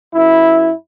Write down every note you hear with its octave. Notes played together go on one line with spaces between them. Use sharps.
F#2 E4